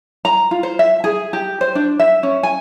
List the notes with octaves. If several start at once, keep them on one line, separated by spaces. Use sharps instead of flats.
A#5
F4
C5
E5
G#4
G4
C5
D4
E5
C#4
G#5